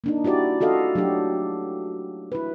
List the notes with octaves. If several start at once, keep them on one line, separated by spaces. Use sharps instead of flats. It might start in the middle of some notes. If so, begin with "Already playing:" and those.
A#3 D4 D#4
E4 F#4 G4 D5
F4 F#4 A4 D#5 F5
F#3 A3 D4 G4
E4 B4